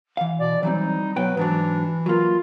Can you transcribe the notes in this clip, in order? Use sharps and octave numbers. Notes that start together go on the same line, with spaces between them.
E3 F5
B2 D5
E3 F#3 G3 C4 D#4
B2 F#3 B4 G5
G#2 E3 F#3 D4
F#3 A#3 F4